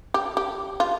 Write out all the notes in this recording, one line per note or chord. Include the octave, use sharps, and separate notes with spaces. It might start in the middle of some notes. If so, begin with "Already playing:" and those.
G4
G4
F4